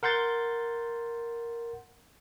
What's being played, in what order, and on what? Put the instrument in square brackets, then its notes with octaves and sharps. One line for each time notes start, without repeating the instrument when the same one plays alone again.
[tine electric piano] A#4 F#5 C6 G6 A6